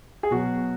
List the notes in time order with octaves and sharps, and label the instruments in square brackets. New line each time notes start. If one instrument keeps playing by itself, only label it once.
[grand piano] G#4
B2 F#3 F#4